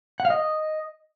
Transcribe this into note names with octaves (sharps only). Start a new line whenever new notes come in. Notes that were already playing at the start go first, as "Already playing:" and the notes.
F#5
F5
D#5